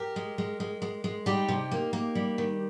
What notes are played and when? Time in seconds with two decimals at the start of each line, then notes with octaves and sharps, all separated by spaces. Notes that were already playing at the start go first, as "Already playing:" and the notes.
Already playing: G4 A#4
0.16 G#3
0.38 G#3
0.60 G#3
0.82 G#3
1.04 G#3
1.26 G3 D#4 G4
1.48 C3
1.71 A#3
1.93 A#3
2.15 G3
2.38 D#3